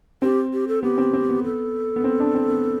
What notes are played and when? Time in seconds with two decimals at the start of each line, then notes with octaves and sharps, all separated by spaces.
0.22 C4 G4
0.53 G4
0.68 A4
0.83 B3 G4
0.98 C4
1.13 C4
1.29 B3
1.44 A4
1.96 B3
2.04 C4
2.20 D4
2.35 C4
2.50 B3